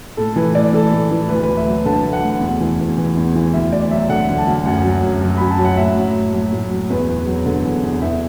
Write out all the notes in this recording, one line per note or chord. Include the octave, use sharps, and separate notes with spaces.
A2 A4
E3 B4
A2 D5
E3 A4
A2
E3
D2 B4
B4
D2
E5
F#3
D3 A5
D2
F#5
D2
E2
E3
E2
E3
E2
E3
D2 E5
D2 D5
F#3 E5
D3 F#5
D2
A5
D2
F#2 F#5
F#3
F#2
F#3
F#2 B5
A5
F#3
F#5
A2 E5
F#3
A2
F#3
A2
F#3
E2 B4
E2
F#3
D3
E2
E2
E2 E5